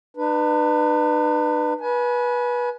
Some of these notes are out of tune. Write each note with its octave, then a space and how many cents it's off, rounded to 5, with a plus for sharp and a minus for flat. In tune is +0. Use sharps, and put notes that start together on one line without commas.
D4 +45 B4 +0
B4 -20 G#5 +30